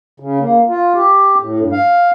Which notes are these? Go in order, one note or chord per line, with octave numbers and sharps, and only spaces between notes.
C#3
A#3
F4
G4
A2
G2
F5